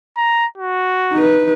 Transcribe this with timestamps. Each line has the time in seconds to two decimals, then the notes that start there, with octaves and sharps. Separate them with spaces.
0.17 A#5
0.58 F#4
1.13 D#4 B4